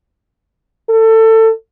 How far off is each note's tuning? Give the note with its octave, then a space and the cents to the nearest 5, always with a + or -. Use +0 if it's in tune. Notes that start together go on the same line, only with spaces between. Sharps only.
A4 +25